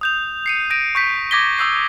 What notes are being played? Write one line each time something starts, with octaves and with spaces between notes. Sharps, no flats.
D#6 G6 F7
C7 C#7 D#7
G6 A#6 D7 D#7
C#6 G6 B6
D6 G#6 A#6 B6 G7
C#6 D#6 E6 G6 C7